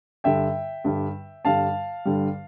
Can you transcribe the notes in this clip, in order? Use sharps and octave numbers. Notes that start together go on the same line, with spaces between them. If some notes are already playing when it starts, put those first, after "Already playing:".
G2 D3 G3 E5 G5
G2 D3 G3
G2 D3 G3 F5 A5
G2 D3 G3